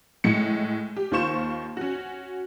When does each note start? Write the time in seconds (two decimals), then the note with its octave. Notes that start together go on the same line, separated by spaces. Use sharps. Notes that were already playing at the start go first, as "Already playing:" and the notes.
0.24 A2 G#3 C#7
0.96 G4
1.11 D#2 D#3 F4 C5 C#6 E7
1.77 C#4 F#4